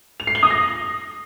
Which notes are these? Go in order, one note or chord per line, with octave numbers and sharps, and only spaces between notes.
F7
C7
G7
D#6
A#6